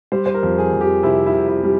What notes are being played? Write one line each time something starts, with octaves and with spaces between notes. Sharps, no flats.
G3 C5
C5
A#4
F2
G#4
F2
G4
C3 E4
E4
C3
E4
G3